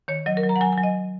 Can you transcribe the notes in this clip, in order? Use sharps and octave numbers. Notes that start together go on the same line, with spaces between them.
D#3 C#5
F#3 D#5
A#4
F#3
A#5
F#5
F#3 G#5
G#5
F#3
D#5